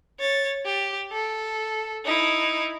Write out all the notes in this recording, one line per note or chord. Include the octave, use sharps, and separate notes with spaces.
C#5 A6
G4
A4
D#4 E4